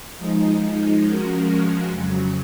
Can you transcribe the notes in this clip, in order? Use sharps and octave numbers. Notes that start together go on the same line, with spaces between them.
F3 G#3 D#4
F3 G#3 C#4 F#4 A#4
F2 C#3 F#3